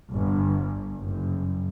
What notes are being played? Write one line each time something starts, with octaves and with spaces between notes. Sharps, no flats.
G1
F#1